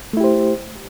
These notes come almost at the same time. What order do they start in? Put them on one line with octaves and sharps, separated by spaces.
A3 E4 G4 C5